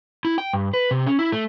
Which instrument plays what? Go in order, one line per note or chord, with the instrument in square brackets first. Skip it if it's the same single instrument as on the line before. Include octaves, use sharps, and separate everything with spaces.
[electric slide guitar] E4
G5
G2
B4
C3
C#4
E4
A3